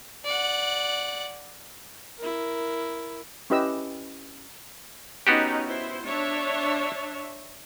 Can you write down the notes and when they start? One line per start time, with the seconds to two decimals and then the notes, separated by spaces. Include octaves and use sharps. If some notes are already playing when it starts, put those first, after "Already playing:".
0.25 D5 F#5
2.18 E4 A#4
3.50 C#4 E4 G4 B4 D#5 E6
5.27 B3 C#4 D#4 F#4 G4
5.67 E4 C5
6.05 D4 C#5 E5